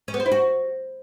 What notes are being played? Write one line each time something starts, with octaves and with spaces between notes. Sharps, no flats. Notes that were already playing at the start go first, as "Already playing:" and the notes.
C#4
B3
C5
E4
F#4